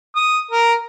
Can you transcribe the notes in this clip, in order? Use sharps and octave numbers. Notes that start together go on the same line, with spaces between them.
D#6
A#4